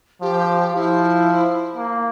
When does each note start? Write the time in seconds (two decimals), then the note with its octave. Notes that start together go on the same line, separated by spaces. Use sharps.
0.21 F3 G4
0.75 F3 E4
1.76 A#3